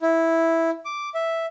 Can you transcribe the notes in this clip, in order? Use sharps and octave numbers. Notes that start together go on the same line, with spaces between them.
E4
D6
E5